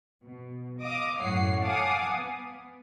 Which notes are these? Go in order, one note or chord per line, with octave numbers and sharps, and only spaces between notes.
B2
D#5 F5 D6 D#6
F#2 A2 C#5 F#5 C7
F5 F#5 G#5 A5 D6 D#6
B3